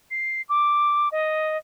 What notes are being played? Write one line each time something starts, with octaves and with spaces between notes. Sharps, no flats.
C7
D6
D#5